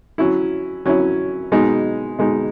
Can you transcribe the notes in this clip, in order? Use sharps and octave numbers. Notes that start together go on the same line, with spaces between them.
F#3 C#4 E4
F#3 C#4 E4
B2 G#3 D#4
B2 G#3 D#4